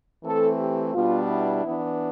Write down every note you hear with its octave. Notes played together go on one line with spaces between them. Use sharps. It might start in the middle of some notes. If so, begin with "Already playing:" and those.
E3 A3 C4 A4
G4
B2 G3 B3 D4 F4
E4
E3 B3 D4